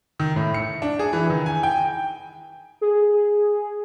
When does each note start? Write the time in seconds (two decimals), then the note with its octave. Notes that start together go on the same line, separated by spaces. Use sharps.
0.19 D#3
0.36 A2
0.54 C#7
0.82 D4
0.99 G#4
1.13 E3
1.30 D#3
1.46 G#5
1.63 G5
2.81 G#4